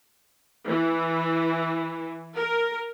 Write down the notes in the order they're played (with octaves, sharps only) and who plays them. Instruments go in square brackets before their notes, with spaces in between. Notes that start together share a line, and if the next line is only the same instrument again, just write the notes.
[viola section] E3
A#4